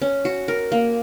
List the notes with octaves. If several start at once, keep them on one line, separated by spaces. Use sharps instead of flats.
C#4
F#4
A#4
A#3